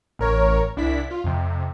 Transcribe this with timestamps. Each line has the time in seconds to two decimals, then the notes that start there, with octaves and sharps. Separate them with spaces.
0.19 A1 A#4 C#5
0.76 C2 D4 E4 B6
1.11 F4
1.24 F2 C3